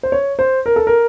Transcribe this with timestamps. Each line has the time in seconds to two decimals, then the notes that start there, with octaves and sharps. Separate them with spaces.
0.03 C5
0.12 C#5
0.39 C5
0.66 A#4
0.76 A4
0.87 A#4